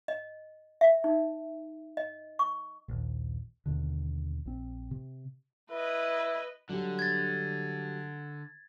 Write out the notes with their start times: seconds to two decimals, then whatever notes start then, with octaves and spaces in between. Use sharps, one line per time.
0.08 D#5
0.81 E5
1.04 D#4
1.97 D#5
2.39 C#6
2.88 A#1 D#2
3.66 D#2 B2 D3
4.45 A#1 C4
4.91 C3
5.71 E4 B4 D#5
6.69 D3 F#3 G3
6.99 G#6 A6